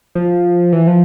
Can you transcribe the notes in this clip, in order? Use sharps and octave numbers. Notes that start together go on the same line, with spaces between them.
F3
E3
F3